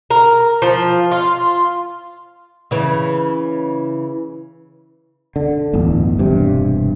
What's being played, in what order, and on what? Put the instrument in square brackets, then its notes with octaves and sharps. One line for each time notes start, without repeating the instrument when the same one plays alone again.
[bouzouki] A#4
F3
F4
[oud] C#3 E3
[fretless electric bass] D3
D1 G1 E2
E1 G2 C3